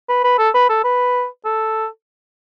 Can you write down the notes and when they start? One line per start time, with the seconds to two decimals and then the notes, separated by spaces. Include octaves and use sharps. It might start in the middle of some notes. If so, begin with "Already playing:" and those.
0.09 B4
0.24 B4
0.39 A4
0.54 B4
0.70 A4
0.84 B4
1.45 A4